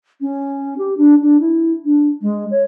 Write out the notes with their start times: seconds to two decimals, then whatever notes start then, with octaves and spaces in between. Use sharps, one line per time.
0.21 C#4
0.78 G4
0.97 D4
1.22 D4
1.40 E4
1.85 D4
2.22 G#3
2.51 C#5